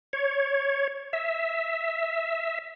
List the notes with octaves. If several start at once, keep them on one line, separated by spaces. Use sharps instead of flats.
C#5
E5